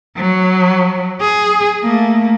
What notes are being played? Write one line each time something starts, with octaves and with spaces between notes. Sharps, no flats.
F#3
G#4
A3 A#3